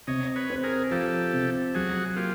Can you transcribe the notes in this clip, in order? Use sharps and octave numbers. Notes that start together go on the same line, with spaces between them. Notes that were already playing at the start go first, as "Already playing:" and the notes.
C3 C#5 D#5
B4 C#5
C4
G#4 A#4
F3 G4 A4
C3
F#3 F#4 G#4
A#3 F4 G4